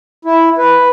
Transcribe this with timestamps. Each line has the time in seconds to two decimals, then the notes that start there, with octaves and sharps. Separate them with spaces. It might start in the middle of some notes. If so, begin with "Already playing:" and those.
0.25 E4
0.58 B4